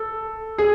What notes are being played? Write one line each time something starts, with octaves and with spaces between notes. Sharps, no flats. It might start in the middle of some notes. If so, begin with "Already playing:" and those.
Already playing: A4
G#4